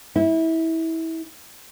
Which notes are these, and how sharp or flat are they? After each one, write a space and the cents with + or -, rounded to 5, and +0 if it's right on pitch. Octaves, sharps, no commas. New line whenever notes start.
E4 -25